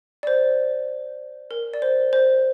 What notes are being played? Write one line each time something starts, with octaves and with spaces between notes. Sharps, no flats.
D5
C5
A#4
D5
C5
C5